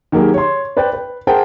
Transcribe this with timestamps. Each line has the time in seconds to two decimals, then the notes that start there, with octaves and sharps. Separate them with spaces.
0.12 D#3 F#3 A#3 G4 G#4
0.34 C#5 C6
0.77 B4 C5 D5 G5
0.93 B4
1.27 G#4 A#4 C5 F#5 G5 A5